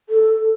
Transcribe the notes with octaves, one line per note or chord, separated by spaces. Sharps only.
A4